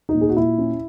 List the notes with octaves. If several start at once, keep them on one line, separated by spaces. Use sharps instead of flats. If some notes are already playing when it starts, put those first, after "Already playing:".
D#4
A#2
G#4
F#4
A#2 E4
C#4